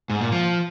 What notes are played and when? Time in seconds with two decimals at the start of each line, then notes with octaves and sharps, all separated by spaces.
0.10 G#2
0.21 A#2
0.32 F3